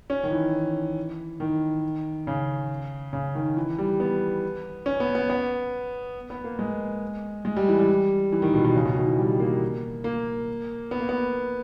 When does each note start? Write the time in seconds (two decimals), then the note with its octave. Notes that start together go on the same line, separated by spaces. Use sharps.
0.10 C#4
0.23 D#3
0.31 E3
1.40 D#3
2.27 C#3
3.13 C#3
3.35 D#3
3.57 E3
3.78 G3
4.00 B3
4.86 C#4
5.00 B3
5.15 B3
5.30 B3
6.30 B3
6.44 A#3
6.59 G#3
7.45 G#3
7.57 G3
7.69 E3
7.79 G3
8.32 E3
8.42 D#3
8.54 B2
8.64 B2
8.75 C#3
8.85 B2
8.97 D#3
9.07 E3
9.18 G3
9.39 A#3
10.04 A#3
10.91 B3
11.00 A#3
11.09 B3